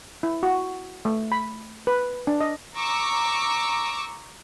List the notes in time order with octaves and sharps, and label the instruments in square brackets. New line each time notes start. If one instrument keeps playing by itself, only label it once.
[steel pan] E4
F#4
A3
B5
B4
D4
D#5
[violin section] A#5 C#6 D6 E6